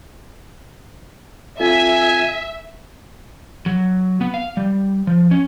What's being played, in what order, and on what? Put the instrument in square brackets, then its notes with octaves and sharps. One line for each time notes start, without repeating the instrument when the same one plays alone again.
[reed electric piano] C4 F4 A4 [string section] E5 [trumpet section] G#5
[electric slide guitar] F#3
B3
F5
G3
F3
C#4